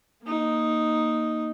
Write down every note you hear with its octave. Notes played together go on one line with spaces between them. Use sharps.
A#3 D#4